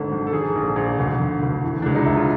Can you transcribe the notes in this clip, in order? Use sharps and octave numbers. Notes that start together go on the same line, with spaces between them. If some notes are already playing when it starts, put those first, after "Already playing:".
Already playing: G#1 D3 A4
G#1
A4
D#3 G#4
A#1
A#1
D2
D3
D2
E3
C#2 D4
D#4
C#2 E4
F4